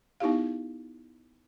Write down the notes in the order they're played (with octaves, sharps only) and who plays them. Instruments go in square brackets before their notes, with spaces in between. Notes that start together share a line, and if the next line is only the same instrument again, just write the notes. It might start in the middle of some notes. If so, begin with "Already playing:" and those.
[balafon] B3 D#4 E4 G4 F5